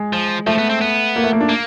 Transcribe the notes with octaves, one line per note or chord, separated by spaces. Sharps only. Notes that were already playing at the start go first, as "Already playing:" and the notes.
Already playing: G#3
F3
F3 A3
B3
C4
B3
A#3
A3
A#3
D4
A#3